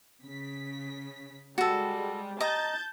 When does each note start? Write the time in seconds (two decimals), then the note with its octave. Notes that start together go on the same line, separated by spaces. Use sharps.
0.23 C#3 B6
1.58 G3 G#3 F#4 A4
2.41 D#5 A5 A#5 G6 A6